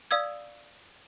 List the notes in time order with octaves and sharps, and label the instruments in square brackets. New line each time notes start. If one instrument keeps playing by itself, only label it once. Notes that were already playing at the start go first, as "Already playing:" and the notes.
[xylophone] D5 F5 D#6 E6 G#6